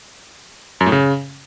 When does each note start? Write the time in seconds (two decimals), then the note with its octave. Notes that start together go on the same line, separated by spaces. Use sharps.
0.81 F#2
0.86 A2
0.92 C#3